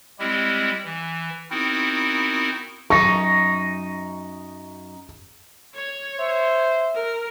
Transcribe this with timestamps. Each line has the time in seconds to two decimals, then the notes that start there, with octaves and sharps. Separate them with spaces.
0.19 G3 G#3 C4 E4 G4
0.85 E3
1.50 B3 C4 D#4 E4 F#4 A#4
2.90 F#2 D#4 C#6
5.75 C#5 G#6
6.18 C5 E5
6.95 A#4